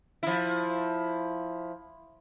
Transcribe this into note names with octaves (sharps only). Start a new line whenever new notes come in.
F3 E4